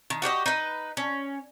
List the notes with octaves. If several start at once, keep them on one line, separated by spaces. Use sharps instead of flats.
D#3
F#4 G4 B4 D#5
D#4 B4
C#4